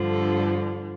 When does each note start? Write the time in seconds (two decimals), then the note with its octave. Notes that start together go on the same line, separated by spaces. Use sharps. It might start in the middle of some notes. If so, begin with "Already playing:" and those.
Already playing: G2 D3 F3
0.10 A4